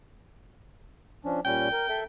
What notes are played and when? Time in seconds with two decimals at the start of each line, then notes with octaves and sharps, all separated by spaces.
1.25 F3 C#4 D4
1.45 A#2 G3 C#4 G5
1.73 A#4
1.90 A4 E5